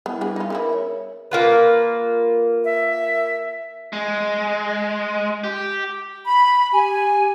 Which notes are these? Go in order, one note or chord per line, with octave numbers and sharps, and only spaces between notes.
G3 B3 E4
B3 D4 G#4 B4
D#4 F4
C#3 B3 E4 A#4
C#5 E5
A#3 F4 B4
E5
G#3
G4
B5
G4 G#5